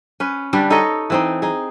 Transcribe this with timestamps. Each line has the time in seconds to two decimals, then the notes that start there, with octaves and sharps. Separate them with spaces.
0.20 C#4 B4
0.53 D3 G3 D4 B4
0.70 D#4 A4 C#5 D#5
1.10 E3 C4 D#4
1.42 D#4 G#4